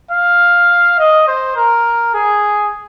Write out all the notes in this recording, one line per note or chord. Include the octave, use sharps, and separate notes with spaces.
F5
D#5
C5
A#4
G#4